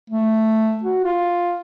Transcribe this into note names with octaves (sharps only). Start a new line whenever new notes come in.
A3
F#4
F4